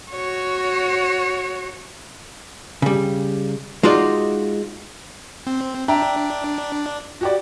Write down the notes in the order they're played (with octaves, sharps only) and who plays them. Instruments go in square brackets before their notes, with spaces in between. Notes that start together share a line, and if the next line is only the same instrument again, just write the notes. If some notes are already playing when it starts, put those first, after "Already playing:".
[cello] F#4 C#5
[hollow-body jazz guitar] C#3 G3
G#3 D#4 F4 F#4 D5
[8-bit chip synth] C4
[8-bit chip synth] D4 [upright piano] E5 G5 A#5
[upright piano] F#4 G4 D5